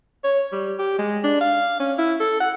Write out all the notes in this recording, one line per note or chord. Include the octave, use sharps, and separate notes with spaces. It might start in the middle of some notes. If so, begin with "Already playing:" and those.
C#5
G3
G4
G#3
D4
F5
C#4
E4
A4
F#5